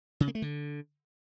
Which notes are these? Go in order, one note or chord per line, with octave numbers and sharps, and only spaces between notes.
C#3
A#3
A3
D3